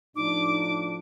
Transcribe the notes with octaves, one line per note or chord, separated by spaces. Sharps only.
A2 F3 D4 D#4 D6